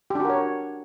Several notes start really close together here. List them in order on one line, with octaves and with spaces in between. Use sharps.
G4 D4 F#4 A#4 C#5